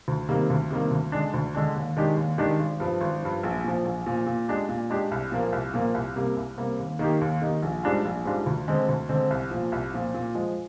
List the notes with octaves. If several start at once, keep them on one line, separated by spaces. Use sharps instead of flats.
D2
C3 D#3 G3 A#3
D2
C3 D#3 G3 A#3
D2
D3 G#3 D4
D2
D3 G#3 D4
D#2
D#3 G#3 D4 G4
D#2
D#3 G#3 D4 G4
G#1
G2 F3
G#1
G2 F3
A#1
A#2 F3
A#1
A#2 F3
A#2
G#3 D4 G4
A#2
G#3 D4 G4
C2
A#2 F3 A#3
C2
A#2 F3 A#3
C2
C3 G3 A#3
C2
C3 G3 A#3
D#2
D#3 A#3 D#4 G4
D#2
D#3 A#3 D#4 G4
A#1
G#2 G3 D4 F4
A#1
G#2 G3 D4 F4
D2
D3 G#3 C4
D2
D3 G#3 C4
C2
A#2 F3
C2
A#2 F3
A#2
F3 G#3